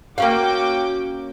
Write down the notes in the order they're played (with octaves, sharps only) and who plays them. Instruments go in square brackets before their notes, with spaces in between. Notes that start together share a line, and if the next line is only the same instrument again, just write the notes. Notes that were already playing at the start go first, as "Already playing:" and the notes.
[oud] A#3 C#4 F5 [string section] F#4 G5 D6